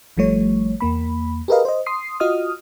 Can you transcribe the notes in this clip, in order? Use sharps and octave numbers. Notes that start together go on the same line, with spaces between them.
G#1 F3 G3 A3 C#5
E2 A#3 B5
G4 G#4 A#4 B4 D#5 F5
C5 D#5
C6 D#6 C7
F4 F#4 D#5 D#6 F6